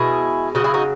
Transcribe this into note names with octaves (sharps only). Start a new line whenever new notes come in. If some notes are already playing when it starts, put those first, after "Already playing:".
Already playing: B2 G#3 E4 G#4
C#3 D#4 F#4
F#3 E4 G#4
D#4 F#4